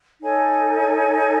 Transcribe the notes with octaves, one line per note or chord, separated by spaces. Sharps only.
D#4 A4 C#5 G#5